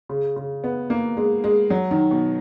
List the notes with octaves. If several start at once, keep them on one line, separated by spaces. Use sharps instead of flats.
C#3
C#3
B3
A#3
G#3
G#3
F#3
D#3
B2